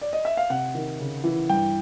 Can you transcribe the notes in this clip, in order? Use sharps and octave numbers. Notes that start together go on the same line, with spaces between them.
D5
D#5
E5
F5
C3 F#5
D#3
C#3
E3
G2 G5